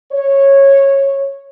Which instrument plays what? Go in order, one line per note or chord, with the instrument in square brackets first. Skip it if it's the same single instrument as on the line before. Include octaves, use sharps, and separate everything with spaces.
[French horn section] C#5